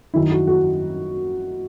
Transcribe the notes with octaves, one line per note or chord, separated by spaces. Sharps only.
F#2 D#3 E4
F#4
F#4